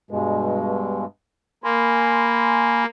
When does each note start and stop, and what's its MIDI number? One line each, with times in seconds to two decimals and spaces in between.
0.11 1.05 43
0.11 1.05 47
0.11 1.05 56
1.64 2.86 58
1.64 2.83 80
1.64 2.83 83
1.64 2.83 84